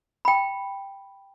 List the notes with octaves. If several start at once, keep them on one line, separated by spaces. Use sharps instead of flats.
G5 B5